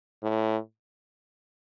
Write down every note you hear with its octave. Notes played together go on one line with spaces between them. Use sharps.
A2